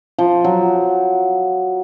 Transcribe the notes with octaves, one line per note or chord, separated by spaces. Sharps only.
F3
F#3